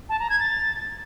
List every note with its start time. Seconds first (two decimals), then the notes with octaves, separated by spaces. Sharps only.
0.09 A5
0.19 A#5
0.30 G#6
0.40 A6